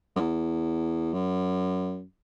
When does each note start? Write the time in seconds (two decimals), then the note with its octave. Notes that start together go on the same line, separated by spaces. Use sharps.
0.16 F#2
0.20 E2
1.13 F#2